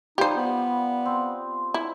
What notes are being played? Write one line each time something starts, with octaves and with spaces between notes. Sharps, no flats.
F3 G3 D#4 G4 C5 A#5
B3
C4
E4